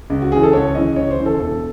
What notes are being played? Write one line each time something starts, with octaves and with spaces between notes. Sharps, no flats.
C#2
F#4
C#3 E3 G#4
A4
C#2 C#5
C#3 E3 D#5
C#2 C#5
C5
C#3 E3
A4
E1 A4